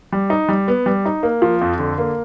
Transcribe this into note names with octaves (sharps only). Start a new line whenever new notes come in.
G3
D#4
G3
B3
G3
D#4
A#3
F3
F2
D3
A#3